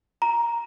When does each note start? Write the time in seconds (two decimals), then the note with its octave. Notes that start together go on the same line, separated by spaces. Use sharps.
0.22 A#5